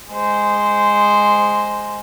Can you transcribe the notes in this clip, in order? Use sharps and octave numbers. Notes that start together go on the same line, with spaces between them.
G#3 C5